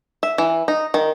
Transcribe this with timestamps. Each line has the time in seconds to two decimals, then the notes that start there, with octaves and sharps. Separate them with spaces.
0.23 E5
0.38 E3
0.68 D#4
0.94 D#3